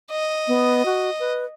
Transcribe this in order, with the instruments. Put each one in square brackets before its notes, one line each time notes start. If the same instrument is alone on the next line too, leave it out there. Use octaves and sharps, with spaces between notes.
[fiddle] D#5
[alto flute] B3
F#4
B4